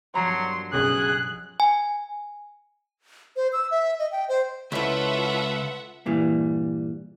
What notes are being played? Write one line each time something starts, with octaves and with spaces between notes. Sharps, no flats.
G2 F3 F#3 A#5 C6
B1 C#3 G#4 F#6
G#5
C5
E6
E5
D#5
G5
C5
C#2 E4 F4 A4 B4 C#5 E5 F#5
G2 A#2 E3 G3